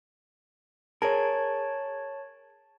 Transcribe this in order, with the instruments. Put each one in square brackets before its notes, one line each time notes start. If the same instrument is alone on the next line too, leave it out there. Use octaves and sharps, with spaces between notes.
[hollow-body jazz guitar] G#4 A#4 [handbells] C#5 A5